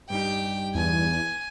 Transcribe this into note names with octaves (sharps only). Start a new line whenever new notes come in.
G2 G3 D#4 G4 G5
E2 G#5